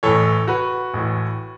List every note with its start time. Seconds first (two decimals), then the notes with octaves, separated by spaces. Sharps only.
0.03 A1 A2 E3 A4 C#5
0.48 F#4 B4
0.94 A1 A2 E3